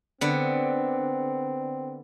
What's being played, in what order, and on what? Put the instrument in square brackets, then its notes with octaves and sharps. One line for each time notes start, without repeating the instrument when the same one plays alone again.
[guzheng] D3 B3 [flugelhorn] C4